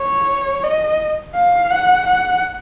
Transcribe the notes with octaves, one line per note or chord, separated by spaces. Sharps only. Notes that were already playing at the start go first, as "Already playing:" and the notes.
Already playing: C#5
D#5
F5
F#5
F#5